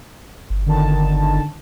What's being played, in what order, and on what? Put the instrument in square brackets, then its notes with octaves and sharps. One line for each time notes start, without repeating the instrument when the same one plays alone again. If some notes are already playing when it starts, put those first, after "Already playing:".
[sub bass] G1
[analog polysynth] D3 D#3 A5